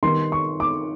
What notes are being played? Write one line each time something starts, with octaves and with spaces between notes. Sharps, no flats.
D#3 G3 B3 C6
C#6
D6